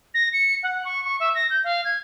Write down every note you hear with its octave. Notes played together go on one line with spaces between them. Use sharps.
A#6
C#7
F#5
C#6
C#6
E5
A#6
G6
F5
G#6